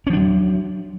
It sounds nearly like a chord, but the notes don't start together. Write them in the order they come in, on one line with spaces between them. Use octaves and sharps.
C#4 F3 D4 F#3